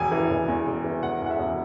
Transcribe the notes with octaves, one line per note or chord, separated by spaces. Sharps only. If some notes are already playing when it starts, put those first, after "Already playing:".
Already playing: E1 G#5
E3
E1
E2
E1
E3
E1 F#5
E2 F#5
E5
E1